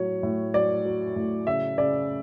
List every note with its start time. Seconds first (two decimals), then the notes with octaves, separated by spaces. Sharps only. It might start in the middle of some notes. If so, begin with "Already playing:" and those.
Already playing: A2 F#3 C#5
0.23 A2
0.54 F#3 D5
0.85 F#3
1.16 A2
1.47 C#3 E5
1.78 C#3 D5